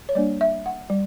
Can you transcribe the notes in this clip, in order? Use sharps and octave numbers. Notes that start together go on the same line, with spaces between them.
C#5
G3 A#3 D4 D5
E5
F#5
G3